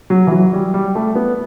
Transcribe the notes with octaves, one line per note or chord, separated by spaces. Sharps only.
F#3
E3
F#3
G3
G3
A3
B3